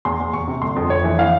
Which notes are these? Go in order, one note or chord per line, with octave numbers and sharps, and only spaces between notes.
E2 C6
E2
E2 C#6
C3
G1 C6
F2
F2 C#5
E3
E3 F5